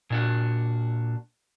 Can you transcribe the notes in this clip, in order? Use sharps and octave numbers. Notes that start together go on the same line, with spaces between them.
A#2 D4 F#4